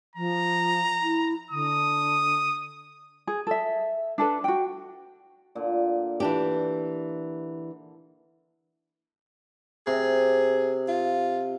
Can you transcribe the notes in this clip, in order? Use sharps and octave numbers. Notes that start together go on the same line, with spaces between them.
F3 A#5
E4
D3 D#6
G#4
A4 E5
D4 A4 B4
F#4 G5
A#2 D3
E3 D4 G4
C3 G#4
F4